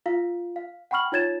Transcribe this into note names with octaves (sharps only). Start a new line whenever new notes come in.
F4 F5
F5
F#5 G5 B5 C#6 F6 F#7
D#4 F4 C#5 G#6 A6 E7